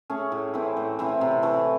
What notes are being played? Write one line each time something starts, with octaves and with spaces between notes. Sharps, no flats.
A3 C#4 G#4
A2
E3 C4 E4
A2
E3 C4 E4
C3
E3 A3